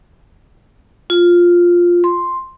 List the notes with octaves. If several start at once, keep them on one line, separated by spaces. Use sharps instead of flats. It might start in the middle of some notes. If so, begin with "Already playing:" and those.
F4
C6